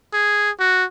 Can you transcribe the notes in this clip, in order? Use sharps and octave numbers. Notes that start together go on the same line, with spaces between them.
G#4
F#4